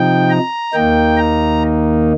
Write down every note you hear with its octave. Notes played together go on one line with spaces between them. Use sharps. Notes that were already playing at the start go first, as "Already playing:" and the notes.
Already playing: C3 F3 D#4 G5
A#5
D#2 D#3 A#3 D#4 G5
A#5